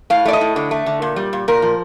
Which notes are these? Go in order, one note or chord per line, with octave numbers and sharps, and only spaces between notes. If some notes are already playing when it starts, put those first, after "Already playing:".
A2 F5
A3 D5
D#5
A2
D3
A3
D3
A#2
G3
A#2
A#2 A#4
F3